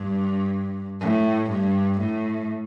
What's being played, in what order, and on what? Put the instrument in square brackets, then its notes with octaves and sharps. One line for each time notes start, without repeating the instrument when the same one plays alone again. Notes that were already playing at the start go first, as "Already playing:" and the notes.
Already playing: [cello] G2
A2
G2
A2